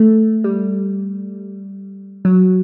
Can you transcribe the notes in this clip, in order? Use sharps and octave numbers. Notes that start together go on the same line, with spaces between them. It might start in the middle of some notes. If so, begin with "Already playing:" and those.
Already playing: A3
G3
F#3